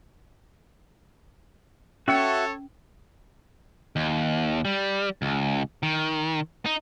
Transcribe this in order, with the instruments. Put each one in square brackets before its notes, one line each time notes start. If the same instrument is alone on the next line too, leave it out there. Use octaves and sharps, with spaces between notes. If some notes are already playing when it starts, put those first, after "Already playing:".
[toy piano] C#4 [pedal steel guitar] F#4 E5 C#6 [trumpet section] A4 C#5
[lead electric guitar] D#2
G3
C#2
D#3
D#4